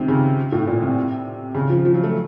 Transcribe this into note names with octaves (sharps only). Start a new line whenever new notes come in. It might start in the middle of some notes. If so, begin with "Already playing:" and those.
Already playing: C3 D#3
C#3
A2
A#2
C3
C#3
F3
F3
F#3
A3